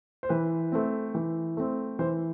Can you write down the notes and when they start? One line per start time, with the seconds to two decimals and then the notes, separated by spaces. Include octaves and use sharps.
0.23 C5
0.29 E3 B4
0.72 A3 C4
1.15 E3
1.57 A3 C4
1.99 E3 C5